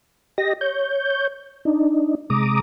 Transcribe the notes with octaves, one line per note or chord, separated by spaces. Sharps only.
G4 D#5 A#6
C#5 G6
D4 D#4
C3 G#3 A#5 D6 D#6